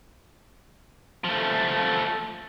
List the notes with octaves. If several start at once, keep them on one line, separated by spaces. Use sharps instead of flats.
F3 A3